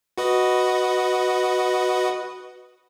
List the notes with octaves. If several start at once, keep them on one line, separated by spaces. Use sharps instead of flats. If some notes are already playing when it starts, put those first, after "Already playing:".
F#4 B4 D#5